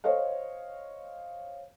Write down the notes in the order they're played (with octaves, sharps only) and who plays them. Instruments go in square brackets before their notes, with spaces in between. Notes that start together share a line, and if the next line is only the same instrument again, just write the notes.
[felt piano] C5 C#5 D#5 F5